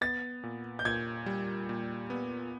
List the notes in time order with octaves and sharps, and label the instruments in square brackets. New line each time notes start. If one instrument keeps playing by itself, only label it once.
[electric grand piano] B3 [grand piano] A6
[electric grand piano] A#2
[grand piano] G6
[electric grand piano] A#2 [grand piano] G#6
[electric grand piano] G3
A#2
B3